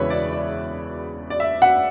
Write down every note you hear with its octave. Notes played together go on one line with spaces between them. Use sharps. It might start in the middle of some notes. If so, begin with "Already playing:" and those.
Already playing: E1 E2 C#3 E3 B4 C#5 E5
D5
D5
D5
E5
F#5